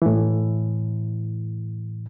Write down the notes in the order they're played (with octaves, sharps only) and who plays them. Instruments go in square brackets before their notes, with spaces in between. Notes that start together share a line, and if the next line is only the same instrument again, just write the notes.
[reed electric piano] A2 E3